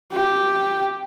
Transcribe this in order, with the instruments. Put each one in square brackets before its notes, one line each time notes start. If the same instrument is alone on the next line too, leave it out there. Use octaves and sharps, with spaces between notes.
[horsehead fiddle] G4